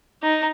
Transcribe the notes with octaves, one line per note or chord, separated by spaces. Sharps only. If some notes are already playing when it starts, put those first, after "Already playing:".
D#4